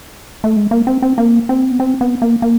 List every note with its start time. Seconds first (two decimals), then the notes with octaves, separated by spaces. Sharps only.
0.44 A3
0.56 G#3
0.71 A#3
0.87 C4
1.02 C4
1.18 A#3
1.49 C4
1.71 B3
1.80 C4
2.01 B3
2.22 A#3
2.42 A#3